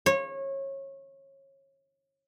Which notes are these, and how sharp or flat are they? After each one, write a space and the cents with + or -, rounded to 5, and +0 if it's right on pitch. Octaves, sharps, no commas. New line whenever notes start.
C#5 -25